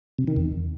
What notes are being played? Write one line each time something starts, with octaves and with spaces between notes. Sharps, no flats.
C3
D#3
E2